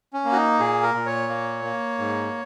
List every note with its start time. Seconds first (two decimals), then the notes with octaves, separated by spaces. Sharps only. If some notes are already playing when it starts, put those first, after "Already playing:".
0.13 C#4
0.25 A#3
0.32 F#4
0.37 D#4
0.60 A#2 G#4
0.83 A#4
0.95 A#2
1.06 C#5
1.29 A#3
1.64 A#3
1.99 G#2